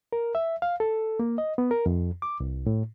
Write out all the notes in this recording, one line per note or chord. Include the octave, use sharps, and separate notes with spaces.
A#4
E5
F5
A4
A#3
D#5
B3
A#4
F2
D6
C2
A2